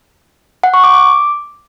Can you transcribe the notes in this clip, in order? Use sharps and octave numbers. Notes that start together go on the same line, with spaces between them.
F#5
C#6
D6
D6